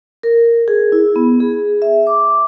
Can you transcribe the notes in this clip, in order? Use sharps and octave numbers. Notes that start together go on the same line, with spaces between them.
A#4
G#4
E4
B3
G#4
E5
D6